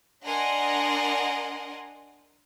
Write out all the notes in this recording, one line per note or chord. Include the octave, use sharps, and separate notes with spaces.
D4 A#4 D#5 F#5 G#5 C6